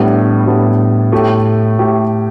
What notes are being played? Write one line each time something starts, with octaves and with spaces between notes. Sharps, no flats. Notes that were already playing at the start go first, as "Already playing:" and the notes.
Already playing: A2 G3 B3 D4
A2 G3 B3 D4
A2 A3 G4
A2 A3 G4